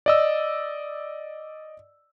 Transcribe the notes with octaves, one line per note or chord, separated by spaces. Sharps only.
D5 D#5 E6